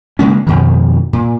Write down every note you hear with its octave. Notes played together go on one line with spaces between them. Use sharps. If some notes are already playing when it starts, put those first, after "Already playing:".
C#3 G#3 A#3 C#4
F2 B2 D#3
A#2